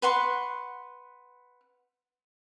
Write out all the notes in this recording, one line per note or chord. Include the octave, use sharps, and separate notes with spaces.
B4 F#5 C6 C#6